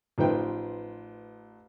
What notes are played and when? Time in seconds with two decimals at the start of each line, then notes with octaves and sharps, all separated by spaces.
0.18 A1 D#3 F3 B4 G5